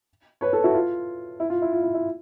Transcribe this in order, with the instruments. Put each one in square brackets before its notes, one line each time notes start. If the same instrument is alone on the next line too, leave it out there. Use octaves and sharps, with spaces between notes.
[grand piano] B4 C#5
A4 B4
E4 F#4
F4
E4
F4
E4
F4
E4
E4